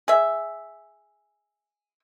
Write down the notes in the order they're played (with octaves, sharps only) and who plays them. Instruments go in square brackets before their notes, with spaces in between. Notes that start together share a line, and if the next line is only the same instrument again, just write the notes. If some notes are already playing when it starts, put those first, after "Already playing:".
[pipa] G#4 E5